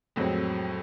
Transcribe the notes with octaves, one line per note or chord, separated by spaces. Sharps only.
F2 A2 F#3 G#3 C4